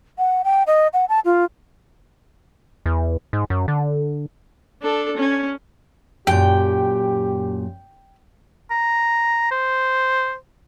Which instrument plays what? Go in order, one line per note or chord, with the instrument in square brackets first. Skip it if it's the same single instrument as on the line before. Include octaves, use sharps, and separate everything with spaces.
[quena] F#5
G5
D#5
F#5
A5
F4
[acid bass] E2
G#2
F#2
D3
[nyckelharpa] D4 A4
C#4
[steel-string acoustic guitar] F#2 A#2 [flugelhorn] G4 [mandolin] G5
[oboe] A#5
C5